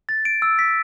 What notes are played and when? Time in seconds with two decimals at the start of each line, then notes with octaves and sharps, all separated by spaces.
0.09 A6
0.25 D7
0.42 E6
0.59 B6